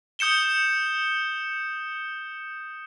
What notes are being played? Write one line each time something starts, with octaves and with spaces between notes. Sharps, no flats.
D#6 G6 C#7 E7 G7